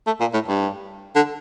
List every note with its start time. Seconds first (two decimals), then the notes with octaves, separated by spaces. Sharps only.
0.07 A3
0.20 A#2
0.34 A2
0.48 G2
1.15 D3